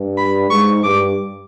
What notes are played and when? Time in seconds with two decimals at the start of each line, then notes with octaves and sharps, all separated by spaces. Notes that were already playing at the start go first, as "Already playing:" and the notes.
Already playing: G2
0.18 B5
0.50 G#2 C#6
0.84 G2 D6